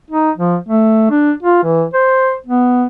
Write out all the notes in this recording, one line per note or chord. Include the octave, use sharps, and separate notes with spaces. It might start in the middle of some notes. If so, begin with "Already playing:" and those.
D#4
F3
A3
D4
F4
E3
C5
B3